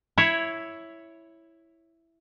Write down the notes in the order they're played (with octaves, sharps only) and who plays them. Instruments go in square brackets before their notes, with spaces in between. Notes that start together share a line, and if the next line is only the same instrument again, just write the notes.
[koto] E4 C#5